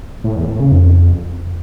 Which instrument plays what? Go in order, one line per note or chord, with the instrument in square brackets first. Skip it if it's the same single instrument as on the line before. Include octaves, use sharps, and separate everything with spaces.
[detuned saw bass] A2
E2
A2
C#3
F2